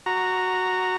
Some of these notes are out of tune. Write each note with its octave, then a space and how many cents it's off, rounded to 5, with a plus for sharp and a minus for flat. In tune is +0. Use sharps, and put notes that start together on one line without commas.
F#4 +0 A#5 -10